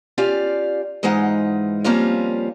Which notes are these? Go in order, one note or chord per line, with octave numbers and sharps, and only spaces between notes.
C#4 F4 G4 D5 F5
G#2 E3 G#3 D#4 F4 F#5
F3 G3 A#3 C4 C#4 F4